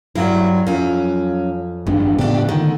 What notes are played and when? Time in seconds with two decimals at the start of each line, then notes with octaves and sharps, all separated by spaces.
0.16 G2 F#3 G3 E4
0.67 F2 F#3 C#4
1.87 G#1 E2 G2 D4
2.19 A2 C#3 B3 D4 G4
2.49 D3 D#3 A3